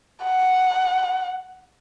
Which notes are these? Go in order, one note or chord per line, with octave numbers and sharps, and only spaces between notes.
F#5